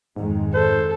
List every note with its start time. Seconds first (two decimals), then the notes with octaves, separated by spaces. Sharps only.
0.16 F2 G#2 D#3 G#3
0.54 A4 C5